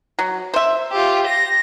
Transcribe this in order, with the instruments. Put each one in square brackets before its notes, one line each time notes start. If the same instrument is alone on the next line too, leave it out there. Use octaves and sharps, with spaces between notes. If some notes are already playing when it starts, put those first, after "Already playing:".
[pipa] F#3
C5 E5
[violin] F4 G4
A#6